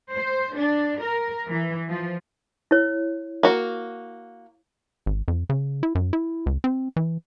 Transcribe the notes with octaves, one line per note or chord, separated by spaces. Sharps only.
C5
D4
A#4
E3
F3
E4 C#5
A#3 F#4
G#1
F2
C#3
E4
F#2
E4
C#2
C4
E3